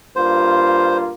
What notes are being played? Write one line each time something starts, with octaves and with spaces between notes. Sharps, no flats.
G2 A#3 F4 C5